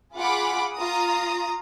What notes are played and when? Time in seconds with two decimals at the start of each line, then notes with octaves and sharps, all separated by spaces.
0.16 F4 G#4 F#5 B5 D6
0.76 F4 A#5 D#6